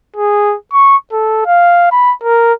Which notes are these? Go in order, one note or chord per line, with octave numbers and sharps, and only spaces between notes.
G#4
C#6
A4
F5
B5
A#4